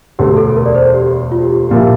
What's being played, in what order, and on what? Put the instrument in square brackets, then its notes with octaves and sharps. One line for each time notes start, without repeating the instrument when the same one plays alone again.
[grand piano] E1 D2 D3 A3 [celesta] G4
[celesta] A4
A#4
D5
C5
G4
F4
G4
F4
[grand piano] A#1 A#2 F3 A#3 E4 [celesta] G4